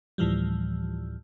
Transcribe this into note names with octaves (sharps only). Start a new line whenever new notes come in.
D2 A2 E3 F3 G3